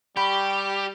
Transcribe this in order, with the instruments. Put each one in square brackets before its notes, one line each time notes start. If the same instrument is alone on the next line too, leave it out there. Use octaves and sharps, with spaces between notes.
[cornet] G3 [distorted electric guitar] G4 [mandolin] G5 B5 C#6